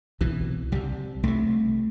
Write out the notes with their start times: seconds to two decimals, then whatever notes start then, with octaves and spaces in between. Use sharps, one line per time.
0.21 C2 B2 E3
0.72 C2 C3 G3
1.23 C2 C3 A3